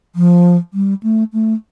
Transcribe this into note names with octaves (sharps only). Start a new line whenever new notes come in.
F3
G3
A3
A3